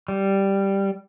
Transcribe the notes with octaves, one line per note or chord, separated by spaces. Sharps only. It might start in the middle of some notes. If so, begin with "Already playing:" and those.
G3